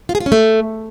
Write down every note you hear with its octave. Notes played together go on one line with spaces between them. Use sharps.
F4
G#4
F4
C#4
A3